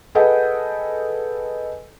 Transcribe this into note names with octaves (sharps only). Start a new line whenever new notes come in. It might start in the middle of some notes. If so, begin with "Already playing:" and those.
G#4 A4 B4 D#5 F#5 G5